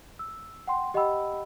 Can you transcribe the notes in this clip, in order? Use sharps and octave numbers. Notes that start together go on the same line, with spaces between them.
E6
F#5 G5 C6
G4 D#5 F#5 G5 B5 E6